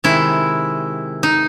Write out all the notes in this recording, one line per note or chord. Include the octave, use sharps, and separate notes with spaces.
C3 D#3 G#3 E4
D#4